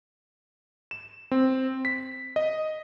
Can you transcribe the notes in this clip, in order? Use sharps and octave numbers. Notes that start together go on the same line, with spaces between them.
E7
C4
B6
D#5